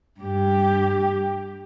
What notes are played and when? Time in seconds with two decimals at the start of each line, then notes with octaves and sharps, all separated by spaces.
0.21 G2 G4